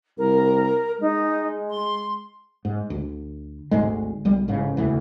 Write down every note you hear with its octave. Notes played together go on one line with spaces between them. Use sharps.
C2 A#4
G#3 D#4
C6
G#2
D2
G#1 D2 G#2 G#3
B1 G3 G#3
A1 G#2 C#3
E1 D2 C#3 E3